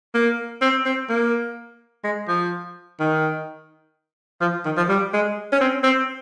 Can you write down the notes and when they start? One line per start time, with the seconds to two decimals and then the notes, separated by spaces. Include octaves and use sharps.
0.15 A#3
0.62 C4
0.86 C4
1.10 A#3
2.04 G#3
2.28 F3
3.00 D#3
4.41 F3
4.66 D#3
4.77 F3
4.89 G3
5.14 G#3
5.53 C#4
5.61 C4
5.84 C4